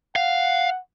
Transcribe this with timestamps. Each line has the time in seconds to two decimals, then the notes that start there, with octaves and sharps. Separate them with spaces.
0.16 F5 F#5